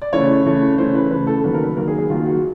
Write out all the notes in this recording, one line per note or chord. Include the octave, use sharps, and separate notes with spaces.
D5
C#3 E3 A3 C#5
C#3 E3 A3
C#3 E3 A3 C5
B4
C#3 E3 A3 B4
A4
D#3 F#3 A#3 B4
A#4
B4
D#3 F#3 A#3 A#4
G#4
G#4
D#3 F#3 A#3 F4
F#4